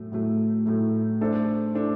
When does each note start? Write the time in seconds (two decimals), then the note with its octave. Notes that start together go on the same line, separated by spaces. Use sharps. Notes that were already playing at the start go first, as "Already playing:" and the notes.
Already playing: A2 F#3 A3
0.12 A2 F#3 A3
0.66 A2 F#3 A3
1.21 A3 D4 A4 C5
1.75 A3 D4 A4 C5